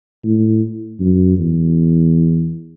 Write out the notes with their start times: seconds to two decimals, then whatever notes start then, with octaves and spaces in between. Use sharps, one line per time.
0.24 A2
1.00 F#2
1.38 E2